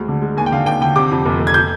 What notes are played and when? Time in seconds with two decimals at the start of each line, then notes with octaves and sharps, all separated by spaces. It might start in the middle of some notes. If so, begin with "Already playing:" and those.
Already playing: D2 G#3
0.08 D3
0.22 G#3
0.37 D#2 G#5
0.46 G5
0.52 D3 F5
0.66 D#2 G5
0.81 D3 G5
0.96 C3 D6
1.11 F2
1.26 F1
1.39 F1
1.47 G#6
1.54 G6